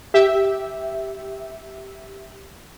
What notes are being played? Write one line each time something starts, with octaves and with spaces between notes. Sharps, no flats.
G4 E5